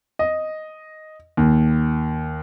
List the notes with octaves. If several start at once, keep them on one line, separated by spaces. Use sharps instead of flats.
D#5
D#2